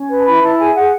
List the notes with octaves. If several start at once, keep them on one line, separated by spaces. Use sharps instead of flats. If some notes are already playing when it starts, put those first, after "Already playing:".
Already playing: C#4
B4
A5
E4 B5
E4 A5
G#4 G#5
G#4 F#5